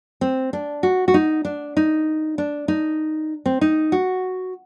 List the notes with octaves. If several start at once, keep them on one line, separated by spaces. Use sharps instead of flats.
C4
D4
F#4
F#4
D#4
D4
D#4
D4
D#4
C4
D#4
F#4